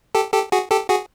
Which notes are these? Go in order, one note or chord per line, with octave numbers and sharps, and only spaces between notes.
G4 A4
G4 A4
F#4 G#4
G4 A4
F#4 G#4